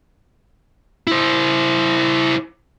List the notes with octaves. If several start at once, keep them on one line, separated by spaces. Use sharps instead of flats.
E4 C5